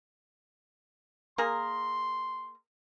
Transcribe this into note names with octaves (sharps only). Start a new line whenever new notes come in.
A#3 G#4 A#4 C6